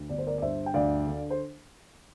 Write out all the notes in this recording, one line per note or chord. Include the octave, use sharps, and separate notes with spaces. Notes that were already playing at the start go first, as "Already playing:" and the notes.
Already playing: D2
G1 D5
C5
A#4 D5
D5
G2 C5 E5
G5
D2 D5 F5
D3
C5